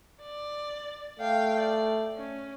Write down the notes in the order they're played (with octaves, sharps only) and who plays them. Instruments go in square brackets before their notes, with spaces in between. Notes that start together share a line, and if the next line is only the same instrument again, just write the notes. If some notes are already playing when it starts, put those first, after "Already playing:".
[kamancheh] D5
[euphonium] A3 [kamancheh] F5 G5
[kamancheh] D5
C#4